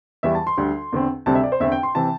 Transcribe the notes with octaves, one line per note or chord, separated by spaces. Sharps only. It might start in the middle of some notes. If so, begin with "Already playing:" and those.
E2 E3 G3 E5
A5
C6
D2 D3 G3
E2 D3 C4
D2 C3 G3 C4 A5
E5
D5
C5
E2 D3 C4 E5
G5
C6
C3 E3 C4 A5